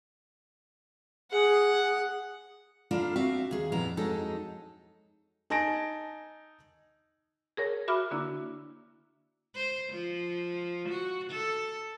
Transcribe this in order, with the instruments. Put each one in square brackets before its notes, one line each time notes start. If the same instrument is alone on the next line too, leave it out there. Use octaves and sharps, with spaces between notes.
[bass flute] G#4 [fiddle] F#5
[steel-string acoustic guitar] A#3 D4 E4 F4 A4
C4 F#4 E5 F5
D#2 G#4
F2 A#2 B3 E4 F5 A#5
F2 F#3 G#3 D#4 A4
[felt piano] D#4 G#5 A5 A#6 D7
[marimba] G#4 A#4 C#5
F#4 E5 B5 D6 F6
D3 A#3 D4 E4
[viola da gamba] C5
F3
F#4
A4